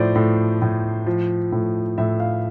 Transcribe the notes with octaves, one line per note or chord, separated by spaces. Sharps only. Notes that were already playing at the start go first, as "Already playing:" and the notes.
Already playing: A2 F3 C5 D5
A2
A2
F3
A2
A2 E5
F5